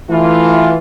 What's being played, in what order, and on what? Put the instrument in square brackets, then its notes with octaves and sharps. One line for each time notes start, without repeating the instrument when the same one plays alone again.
[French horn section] E3 [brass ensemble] A3 E4 F4